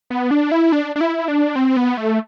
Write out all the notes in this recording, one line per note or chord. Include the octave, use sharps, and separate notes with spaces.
B3
D4
E4
D4
D4
E4
D4
C4
B3
A3